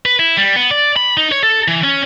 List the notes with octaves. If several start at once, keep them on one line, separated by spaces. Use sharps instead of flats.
B4
E4
G3
B3
D5
B5
D#4
C#5
A4
E3
C#4